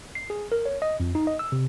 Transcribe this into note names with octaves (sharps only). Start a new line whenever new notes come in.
C7
G#4
A#4
C#5
D#5
F2
D#4
D#5
E6
C3